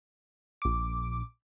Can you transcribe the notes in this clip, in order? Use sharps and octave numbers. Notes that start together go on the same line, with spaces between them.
A#1 D6